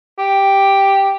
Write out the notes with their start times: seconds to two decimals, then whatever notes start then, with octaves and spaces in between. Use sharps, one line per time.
0.19 G4